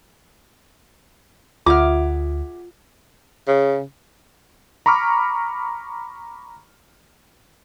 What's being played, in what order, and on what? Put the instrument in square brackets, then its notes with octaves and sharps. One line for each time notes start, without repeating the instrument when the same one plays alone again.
[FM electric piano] D2 [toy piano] F4 [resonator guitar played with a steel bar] G#4 E5 F#5 [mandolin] D6 F6
[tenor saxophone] C#3
[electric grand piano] A#5 B5 C#6 D6 F6